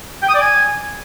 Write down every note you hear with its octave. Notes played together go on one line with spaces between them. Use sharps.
G5
D#6
D5
G#5